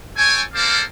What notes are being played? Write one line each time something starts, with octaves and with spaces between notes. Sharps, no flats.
A4 C#5 G5 G#5
A#3 C4 A4 C5 D5 F5